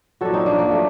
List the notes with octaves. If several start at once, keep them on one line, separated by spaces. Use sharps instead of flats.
A#2 F#3 F#4 A4
C4 D#4
A#3 D4
A#3
A#2 F#3 A3